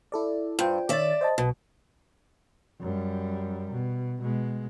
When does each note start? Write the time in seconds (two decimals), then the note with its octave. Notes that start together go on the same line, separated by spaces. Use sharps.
0.12 E4 A4 D5
0.59 G2 F4 C5 G5
0.89 D#3 C#5 D5 E5 A6
1.21 C5 D#5 A5
1.38 B1 B2
2.80 F#2 G3
3.72 B2
4.22 B2 G#3